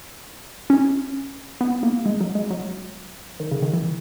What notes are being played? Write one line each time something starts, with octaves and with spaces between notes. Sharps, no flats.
C#4
B3
A#3
G#3
F#3
G#3
F#3
D#3
C#3
D#3
E3